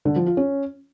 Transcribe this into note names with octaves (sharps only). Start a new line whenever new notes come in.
D3
F3
F4
C#4